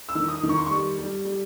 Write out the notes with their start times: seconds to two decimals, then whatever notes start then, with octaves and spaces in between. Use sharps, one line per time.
0.09 E6
0.15 D#3
0.28 D#6
0.43 D#3
0.49 C#6
0.58 C6
0.67 G3 C#6
0.98 G3
1.25 G3